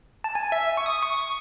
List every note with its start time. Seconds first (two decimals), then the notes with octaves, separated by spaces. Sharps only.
0.24 A5
0.35 G#5
0.52 E5
0.77 C#6
0.86 D#6
1.03 C#6